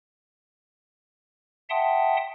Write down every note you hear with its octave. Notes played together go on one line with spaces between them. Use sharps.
E5 F#5 G5 A5 C6 D#6